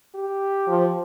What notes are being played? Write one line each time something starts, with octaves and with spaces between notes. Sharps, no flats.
G4
F3